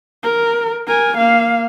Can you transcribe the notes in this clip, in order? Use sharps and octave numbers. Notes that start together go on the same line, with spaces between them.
A#4
A#4 G#5
A#3 F5